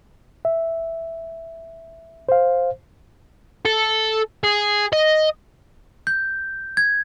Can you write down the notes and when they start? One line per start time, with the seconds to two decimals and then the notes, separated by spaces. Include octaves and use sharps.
0.45 E5
2.29 C5 F5
3.65 A4
4.44 G#4
4.93 D#5
6.07 G6
6.77 G#6